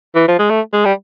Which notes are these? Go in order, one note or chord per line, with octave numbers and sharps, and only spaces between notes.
E3
F3
G#3
A3
G#3
G3